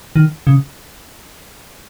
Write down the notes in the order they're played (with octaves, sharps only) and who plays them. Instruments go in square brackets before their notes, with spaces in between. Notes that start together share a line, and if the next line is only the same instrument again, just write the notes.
[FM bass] D#3
C#3